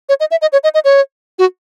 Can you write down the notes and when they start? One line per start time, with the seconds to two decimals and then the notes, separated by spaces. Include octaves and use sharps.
0.09 C#5
0.20 D#5
0.31 E5
0.42 D#5
0.52 C#5
0.64 D#5
0.74 D#5
0.85 C#5
1.39 F#4